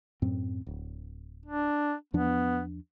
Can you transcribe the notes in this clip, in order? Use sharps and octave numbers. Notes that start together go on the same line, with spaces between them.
F#2 A2 C4
D1
D4
E2 F3 B3 D4